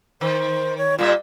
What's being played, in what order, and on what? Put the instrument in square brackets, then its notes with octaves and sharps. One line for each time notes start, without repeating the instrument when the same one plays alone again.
[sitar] D#3 [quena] C5
[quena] C#5
[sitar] A#2 G3 E5 [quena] F4